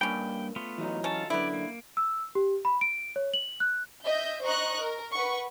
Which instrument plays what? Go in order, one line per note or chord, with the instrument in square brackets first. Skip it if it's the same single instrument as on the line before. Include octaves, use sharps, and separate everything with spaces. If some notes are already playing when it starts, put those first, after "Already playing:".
[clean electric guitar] G2 A#3 B5 [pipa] C#4 D4 [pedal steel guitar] G5
[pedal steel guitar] A3 B3 F4
[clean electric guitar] E3 F#3 D#4
[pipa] C#4 [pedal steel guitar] F4 A4 A5
[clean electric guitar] F#2 D3 [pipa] B3 E4 [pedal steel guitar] D5
[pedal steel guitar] A#3
[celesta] E6
G4
B5
D7
C#5
F#7
F#6
[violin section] D#5 E5 G6
C5 D#5 A#5 C#6 F#6
A#4
B4 F#5 C#6